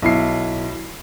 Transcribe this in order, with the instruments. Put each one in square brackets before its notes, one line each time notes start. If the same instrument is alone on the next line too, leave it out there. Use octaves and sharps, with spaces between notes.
[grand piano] B1 E4 C7